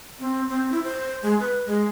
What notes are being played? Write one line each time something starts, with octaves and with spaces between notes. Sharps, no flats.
C4
C4
E4
C5
G#3
B4
G#3